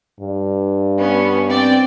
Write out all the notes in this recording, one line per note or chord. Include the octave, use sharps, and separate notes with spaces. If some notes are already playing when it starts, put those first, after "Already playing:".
G2
B3 C#4
C4 D5 G5